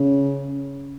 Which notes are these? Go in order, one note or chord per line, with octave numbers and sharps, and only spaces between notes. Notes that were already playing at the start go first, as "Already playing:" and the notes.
Already playing: C#3